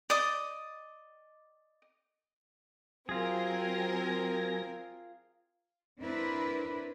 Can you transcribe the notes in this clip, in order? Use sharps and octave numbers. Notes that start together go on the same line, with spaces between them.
D5 D#5 D#6
F#3 C4 F4 G#4 A#4 G#5 A#6
C4 D4 E4 A#4 B4